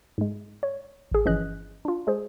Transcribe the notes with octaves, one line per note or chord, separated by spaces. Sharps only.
G#2 G#3
C#5
A1 G#4
G1 E3 F3 C#4 D#5 F#6
D4 F4
G#3 G#4 C5